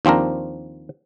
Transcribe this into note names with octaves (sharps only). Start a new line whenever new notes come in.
D#2 F3 C4 D4 A#4